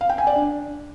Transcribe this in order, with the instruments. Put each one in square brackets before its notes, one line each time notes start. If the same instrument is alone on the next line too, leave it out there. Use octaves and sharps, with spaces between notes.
[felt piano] F5
G5
G#5
D5
D4